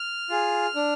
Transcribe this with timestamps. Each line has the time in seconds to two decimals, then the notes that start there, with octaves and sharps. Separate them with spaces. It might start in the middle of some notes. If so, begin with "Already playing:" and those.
Already playing: F6
0.30 F4 G#4
0.75 D4